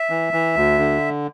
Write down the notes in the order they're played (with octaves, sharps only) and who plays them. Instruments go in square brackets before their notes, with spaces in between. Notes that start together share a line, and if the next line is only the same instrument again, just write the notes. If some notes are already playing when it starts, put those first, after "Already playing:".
Already playing: [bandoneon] E5
E3
E3
D2
D3